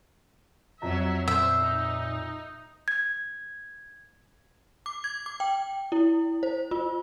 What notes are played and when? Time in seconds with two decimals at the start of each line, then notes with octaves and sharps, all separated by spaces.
0.82 F2 F#3 E5 A#5
1.28 A#2 C5 E5
1.61 D#4
2.88 G#6
4.86 D6
5.04 G#6
5.26 D6
5.40 G5
5.92 E4
6.43 C5
6.71 F4